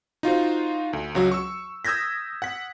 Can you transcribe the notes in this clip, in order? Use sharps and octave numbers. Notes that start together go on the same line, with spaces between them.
D#4 F4 F#4 C5
D2
C#2 F#3 F#4
C#6 E6
D#6 E6 G6 G#6 A#6 B6
F#5 B6